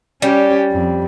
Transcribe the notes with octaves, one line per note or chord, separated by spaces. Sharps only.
G3 C#4 G4
F2